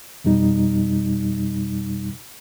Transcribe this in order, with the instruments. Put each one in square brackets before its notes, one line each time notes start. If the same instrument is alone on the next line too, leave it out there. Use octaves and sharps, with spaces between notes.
[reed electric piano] F2 B2 G3 D#4